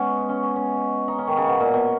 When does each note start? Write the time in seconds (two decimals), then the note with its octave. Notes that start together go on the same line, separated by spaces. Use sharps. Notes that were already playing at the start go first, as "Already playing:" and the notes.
Already playing: G#3 B3 C#4
0.29 C#4
0.43 C#4
0.56 C#4
1.08 D#4
1.19 C#4
1.27 D#3
1.37 C#3
1.48 B2
1.60 A#2
1.74 B2